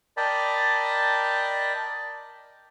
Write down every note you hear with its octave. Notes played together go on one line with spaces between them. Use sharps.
A#4 D5 D#5 G5 A5 B5